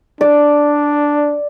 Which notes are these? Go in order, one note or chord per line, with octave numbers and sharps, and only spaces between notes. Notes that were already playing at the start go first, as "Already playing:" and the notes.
D4 D5